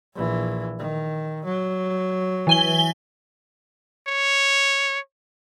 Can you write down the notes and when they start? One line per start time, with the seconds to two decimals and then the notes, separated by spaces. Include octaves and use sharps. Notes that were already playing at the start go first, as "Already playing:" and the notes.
0.15 A#1 E3
0.79 D#3
1.45 F#3
2.47 E3 G#5 G7
4.07 C#5